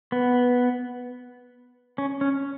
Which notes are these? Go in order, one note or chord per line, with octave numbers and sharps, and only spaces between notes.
B3
C#4
C#4